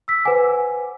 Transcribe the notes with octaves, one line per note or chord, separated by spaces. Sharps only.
E6 B6
B4 C5 F#5 G#5 D6